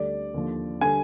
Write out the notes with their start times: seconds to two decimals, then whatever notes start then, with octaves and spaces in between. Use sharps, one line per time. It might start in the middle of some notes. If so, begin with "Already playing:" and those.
Already playing: D2 D3 G3 D5
0.34 D#2 D3 F3
0.81 D3 G3 G#5